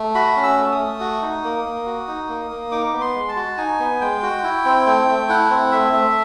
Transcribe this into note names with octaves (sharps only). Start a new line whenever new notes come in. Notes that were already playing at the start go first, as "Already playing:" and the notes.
Already playing: A3
F#4 B5
C#4
E6
A3
D#6
A3
F#4
D#4
A#3
A#3
F#4
D#4
A#3
A#3
D#4 D6
B3
C6
G#3
A5
F#4
D#4 G#5
B3
G#3 G5
F#4
E4
C4
A3
A3
E4 F#5
C4
A3 E5
A3